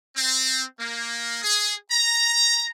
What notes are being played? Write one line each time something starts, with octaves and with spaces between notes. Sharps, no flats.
C4
A#3
G#4
A#5